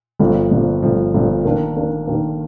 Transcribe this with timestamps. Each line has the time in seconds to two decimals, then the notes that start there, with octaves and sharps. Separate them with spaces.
0.19 G1 G2 F3
0.51 G1 G2 F3
0.82 G1 G2 F3
1.14 G1 G2 F3
1.45 D#3 A#3 D4
1.76 D#3 A#3 D4
2.06 D#3 A#3 D4